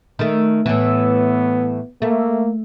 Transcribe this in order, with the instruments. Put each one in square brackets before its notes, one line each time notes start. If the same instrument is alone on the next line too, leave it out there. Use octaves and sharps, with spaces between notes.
[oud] D#3 A3
[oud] A2 E3 [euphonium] B3
[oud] A3 [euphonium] A#3